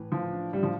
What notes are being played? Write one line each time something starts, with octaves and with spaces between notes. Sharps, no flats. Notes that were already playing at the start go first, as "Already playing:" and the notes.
Already playing: A2 E3
A2 F3
D4
A2 G3
F3